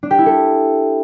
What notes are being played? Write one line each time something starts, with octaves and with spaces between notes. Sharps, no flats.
D4
G4
E4
A4